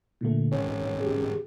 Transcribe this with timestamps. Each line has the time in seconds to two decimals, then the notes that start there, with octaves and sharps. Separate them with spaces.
0.21 A#2 D3 A3
0.52 G#1 C#4
1.00 G4 G#4